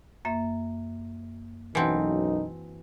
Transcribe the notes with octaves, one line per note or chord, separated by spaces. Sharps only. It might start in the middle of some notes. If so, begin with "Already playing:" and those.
F#2 A#3 E5
B1 F#2 E3 C4 D#4 F#4 F#5 A5